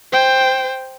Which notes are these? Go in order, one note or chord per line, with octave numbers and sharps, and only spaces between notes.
C5 G5